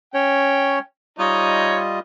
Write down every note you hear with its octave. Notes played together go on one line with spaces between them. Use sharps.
C#4 C#5 G5
G3 D#4 F4 C#5 D#5